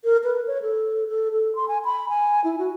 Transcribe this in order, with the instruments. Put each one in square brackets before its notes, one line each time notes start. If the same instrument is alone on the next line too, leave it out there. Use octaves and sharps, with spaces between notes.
[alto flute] A#4
B4
C#5
A4
A4
A4
C6
G#5
B5
G#5
E4
F#4